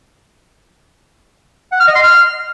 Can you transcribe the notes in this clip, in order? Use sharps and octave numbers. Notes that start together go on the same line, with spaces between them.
F#5
F6
D#5
C6
F6